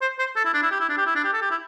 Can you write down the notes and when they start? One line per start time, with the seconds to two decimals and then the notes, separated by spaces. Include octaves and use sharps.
0.01 C5
0.19 C5
0.36 A4
0.45 E4
0.54 D4
0.63 E4
0.71 G4
0.80 E4
0.89 D4
0.98 G4
1.06 E4
1.15 D4
1.24 G4
1.33 A4
1.42 G4
1.51 E4